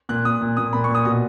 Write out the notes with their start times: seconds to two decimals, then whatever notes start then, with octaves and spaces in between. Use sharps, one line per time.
0.09 A#2 F#6
0.25 A#2 D#6
0.41 A#2
0.57 A#2 D#6
0.73 A#2 B5
0.84 C#6
0.89 A#2
0.95 D#6
1.05 B2 D#6